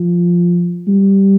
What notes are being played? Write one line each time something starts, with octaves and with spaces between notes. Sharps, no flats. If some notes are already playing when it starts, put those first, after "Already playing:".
Already playing: F3
G3